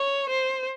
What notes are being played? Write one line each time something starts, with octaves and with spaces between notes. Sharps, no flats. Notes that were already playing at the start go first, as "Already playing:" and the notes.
Already playing: C#5
C5